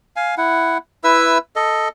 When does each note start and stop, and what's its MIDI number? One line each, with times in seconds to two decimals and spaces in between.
0.16 0.35 77
0.16 0.35 80
0.37 0.78 64
0.37 0.78 78
1.04 1.38 64
1.04 1.38 71
1.04 1.38 76
1.04 1.38 88
1.56 1.88 69
1.56 1.88 75